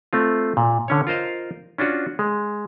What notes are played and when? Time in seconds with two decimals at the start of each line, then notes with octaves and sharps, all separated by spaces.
0.13 A3 C4 F4
0.57 A#2
0.88 D3 C#4 C#5
1.07 F4 A#4 C5 D#5 F5
1.78 C#4 D4 F4 F#4
2.19 G#3